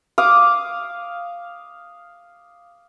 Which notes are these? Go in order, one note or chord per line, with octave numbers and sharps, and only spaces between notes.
F5 D6 D#6